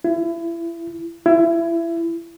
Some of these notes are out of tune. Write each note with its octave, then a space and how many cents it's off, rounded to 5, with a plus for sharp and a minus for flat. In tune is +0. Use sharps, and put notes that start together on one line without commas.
E4 +30
E4 +25